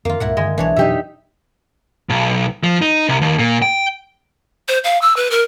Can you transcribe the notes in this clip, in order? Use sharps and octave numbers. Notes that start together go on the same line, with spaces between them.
F2 D#3 A#3 F4
C#2 G2 A#2 E4 A#4 F#5
G2 D3 D#3 G#3
B1 E3 D4 C#5
F2 B2 F#3 D#4 G4 E5
B1
F3
D#4
C2
D#2
A#2
G5
C5
F5
E6
B4
A#4